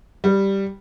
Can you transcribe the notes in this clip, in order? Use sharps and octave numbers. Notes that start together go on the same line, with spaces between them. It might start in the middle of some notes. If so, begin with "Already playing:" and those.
G3